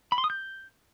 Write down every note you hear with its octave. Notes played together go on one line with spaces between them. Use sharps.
B5
C6
D#6
G6